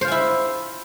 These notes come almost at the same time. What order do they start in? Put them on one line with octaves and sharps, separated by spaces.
C5 F4 G#5 E4